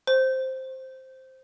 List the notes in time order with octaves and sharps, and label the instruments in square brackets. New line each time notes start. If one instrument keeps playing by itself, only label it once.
[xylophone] C5